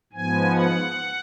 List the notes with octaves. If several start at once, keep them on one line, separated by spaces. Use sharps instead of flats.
G#2 F3 B3 G#5
F#5